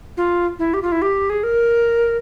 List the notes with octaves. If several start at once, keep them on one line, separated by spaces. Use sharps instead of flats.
F4
E4
G4
F4
E4
G4
G#4
A#4